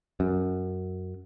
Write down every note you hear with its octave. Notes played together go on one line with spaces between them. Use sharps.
F#2